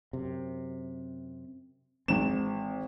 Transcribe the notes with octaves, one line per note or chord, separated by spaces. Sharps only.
F#2 C3
G#1 E3 C4 E7